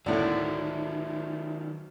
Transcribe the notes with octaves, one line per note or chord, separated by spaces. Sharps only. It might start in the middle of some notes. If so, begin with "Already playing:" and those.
D2 A2 D3 D#3 F#3 D4 E4